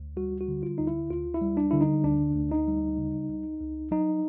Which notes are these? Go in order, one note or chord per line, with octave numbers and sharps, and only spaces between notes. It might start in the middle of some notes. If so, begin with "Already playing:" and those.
Already playing: D2
G3 F#4
F#4
D3
F4
D2 D#4
E4
D2 F4
E4
G3
D4
D3 E4
D#4
D2 D4
D2
D#4
G3
C#3
C#2
C#2
F#3 D#4